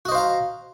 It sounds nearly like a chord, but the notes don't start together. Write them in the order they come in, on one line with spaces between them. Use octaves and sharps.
F#4 D#5 C5 F5 A#5